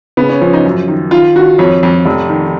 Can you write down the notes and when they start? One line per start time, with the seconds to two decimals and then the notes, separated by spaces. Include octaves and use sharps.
0.17 C#3 B3
0.29 C#4
0.41 F3 C#4
0.53 D#4
0.65 F#2
0.88 D#3
1.11 D#3 F4
1.36 D#3 F#4
1.59 F2 C#5
1.83 F2
2.05 F1
2.29 D#3